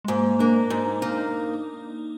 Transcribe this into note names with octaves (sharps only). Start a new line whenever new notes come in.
G#3
G#2 A#3
A#3 D4
G#2 D#4
A#3 D#4